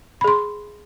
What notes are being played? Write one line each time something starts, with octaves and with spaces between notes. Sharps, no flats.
G#4 B5 C6